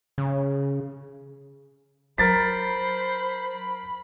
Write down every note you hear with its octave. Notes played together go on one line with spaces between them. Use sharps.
C#3
F#3 A#4 C5 B5 A6 B6